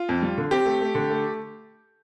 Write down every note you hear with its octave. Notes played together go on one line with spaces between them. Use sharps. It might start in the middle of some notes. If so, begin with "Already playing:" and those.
Already playing: F4
F2
G3
D3
C4 G4
A3
A3
D3
A3